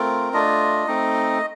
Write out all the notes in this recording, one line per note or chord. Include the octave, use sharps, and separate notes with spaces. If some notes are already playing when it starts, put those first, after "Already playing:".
Already playing: A3 C4 F4 A#4
A3 D4 F4 D#5
A3 C4 D#4